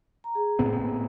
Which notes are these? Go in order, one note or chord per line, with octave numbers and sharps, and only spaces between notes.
A#5
G#4
A2 B3 C4
A#3